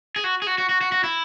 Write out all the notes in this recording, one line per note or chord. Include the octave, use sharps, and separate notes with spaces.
G#4
F#4
G#4
F#4
F#4
F#4
F#4
F#4
E4